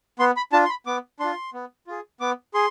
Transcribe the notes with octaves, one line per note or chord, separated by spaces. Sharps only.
B3 C6
B5
D4 F4 A5
C6
B5
B3 D6
D4 F4 C6
B3
F4 G#4
B3 D6
G#4 C6